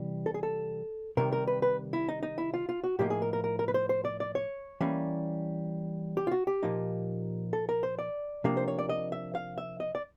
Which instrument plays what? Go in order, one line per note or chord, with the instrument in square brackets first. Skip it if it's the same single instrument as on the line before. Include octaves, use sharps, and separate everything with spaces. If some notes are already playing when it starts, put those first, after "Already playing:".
Already playing: [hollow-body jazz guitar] C3 E3 G3
A4
G#4
A4
C3 D#3 G3 A#4
A#4
B4
B4
E4
D#4
D#4
E4
F4
F4
F#4
A2 F3 A#3 D#4 G4
G#4
A#4
A#4
A#4
A#4
B4
C5
C5
D5
D5
C#5
E3 G3 A#3 C#4
G4
F4
F#4
G4
A#2 F3 A#3 D#4
A4
A#4
C5
D5
C3 F3 A#3 D4
C5
C#5
D5
D#5
E5
F5
E5
D#5
D5